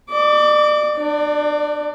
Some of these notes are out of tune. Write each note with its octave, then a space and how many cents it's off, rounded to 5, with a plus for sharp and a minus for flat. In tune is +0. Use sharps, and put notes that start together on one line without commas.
D5 +35 D6 -20
D4 +35 D5 +0